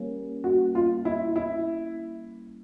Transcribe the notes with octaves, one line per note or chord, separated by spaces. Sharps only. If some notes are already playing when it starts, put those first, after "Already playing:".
Already playing: G3 A#3 C#4
F#4
F4
E4
E4